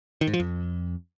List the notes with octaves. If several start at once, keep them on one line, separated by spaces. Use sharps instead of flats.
D#3
G#2
F3
F2